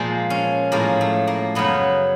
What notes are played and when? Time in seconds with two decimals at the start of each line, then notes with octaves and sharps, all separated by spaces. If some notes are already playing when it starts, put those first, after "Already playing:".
Already playing: A#2 F3 G#3 A#3
0.30 C#4
0.72 A2 F3 G#3 A#3
1.01 A3
1.27 A#3
1.55 F#2 C#3 F#3 B3